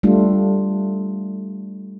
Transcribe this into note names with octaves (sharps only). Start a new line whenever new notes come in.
G3 A3 D4 F4